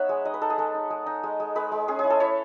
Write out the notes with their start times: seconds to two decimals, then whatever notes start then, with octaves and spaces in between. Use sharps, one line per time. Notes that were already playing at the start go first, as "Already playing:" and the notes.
Already playing: B3 D#4 C#5 E5 F#5
0.09 G#3
0.25 D#4 D#5
0.34 B4
0.41 D#4 A4
0.50 G#4
0.58 G#3 A4
0.74 D#4
0.90 G#3
1.06 D#4
1.23 G#3
1.40 G#3
1.55 G#3 B4
1.72 G#3
1.88 C#4 G#4
1.99 G#4
2.04 E4
2.10 A4
2.20 E4 C#5